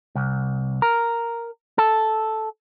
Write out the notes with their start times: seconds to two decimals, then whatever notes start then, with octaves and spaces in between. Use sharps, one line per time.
0.15 C2
0.82 A#4
1.78 A4